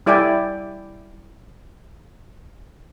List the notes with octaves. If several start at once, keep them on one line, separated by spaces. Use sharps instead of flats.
G3 E4 D5 E5 G5 G#5